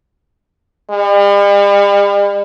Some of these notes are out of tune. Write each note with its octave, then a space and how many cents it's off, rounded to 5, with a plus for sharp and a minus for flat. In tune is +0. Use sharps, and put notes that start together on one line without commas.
G3 +45